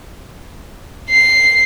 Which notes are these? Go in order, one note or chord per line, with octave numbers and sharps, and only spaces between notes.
C7